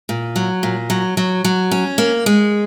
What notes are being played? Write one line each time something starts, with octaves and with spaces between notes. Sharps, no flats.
A#2
F#3
A#2
F#3
F#3
F#3
C#4
A#3
G#3